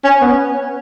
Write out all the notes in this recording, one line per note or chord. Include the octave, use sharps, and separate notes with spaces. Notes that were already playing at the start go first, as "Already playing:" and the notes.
C#4
B3